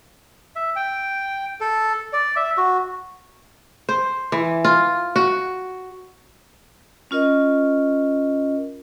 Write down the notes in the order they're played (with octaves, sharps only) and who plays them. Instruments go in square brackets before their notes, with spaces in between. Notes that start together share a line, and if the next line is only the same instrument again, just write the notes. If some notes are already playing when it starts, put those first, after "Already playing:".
[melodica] E5
G5
A4
D5
E5
F#4
[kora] C5
E3
F4
F#4
[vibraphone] C#4 F4 A#4 D#5